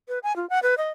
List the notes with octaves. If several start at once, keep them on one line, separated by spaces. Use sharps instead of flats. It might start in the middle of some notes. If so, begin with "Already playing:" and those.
B4
G#5
F4
F#5
B4
D#5